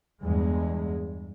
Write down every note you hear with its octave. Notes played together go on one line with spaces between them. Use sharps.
E2 G2 G#3